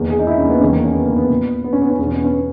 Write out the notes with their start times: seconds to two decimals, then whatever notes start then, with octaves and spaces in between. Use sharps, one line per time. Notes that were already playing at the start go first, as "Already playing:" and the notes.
Already playing: E2 D#3 A#3
0.10 G#4
0.19 D#4
0.27 E4
0.38 C#4
0.45 A#3
0.50 B3
0.61 E2 D#3 C#4
0.73 A#3
0.84 C#4
0.95 B3
1.05 A#3
1.16 B3
1.30 A#2
1.64 B3
1.73 C#4
1.82 B3
1.90 C#4
1.98 E2 B3
2.03 B2 C#4
2.16 B3
2.25 C#4
2.33 B3